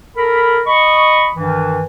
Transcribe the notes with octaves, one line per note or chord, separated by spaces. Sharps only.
A4 A#4 B5
D#5 B5 C#6
G2 D#3 E3